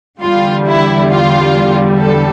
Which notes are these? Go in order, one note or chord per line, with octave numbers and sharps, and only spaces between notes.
E2 D3 G3 F4
E4
F4
A4